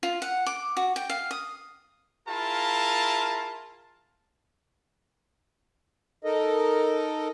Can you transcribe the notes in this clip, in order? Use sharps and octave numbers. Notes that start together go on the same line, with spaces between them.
F4
F#5
D6
F#4
G5
F5
D#6
E4 F4 G#4 A#4 F5 A5
D#4 A4 A#4 D#5